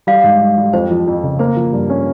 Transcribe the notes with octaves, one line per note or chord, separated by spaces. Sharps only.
G3 F5
G#2
G3
G3
F2 C5
F3
F2
C#3
A#3 C5
F3
G2
C#4